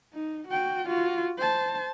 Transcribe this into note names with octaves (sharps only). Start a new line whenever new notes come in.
D#4
F#4 G5
F4 F#4
C5 A5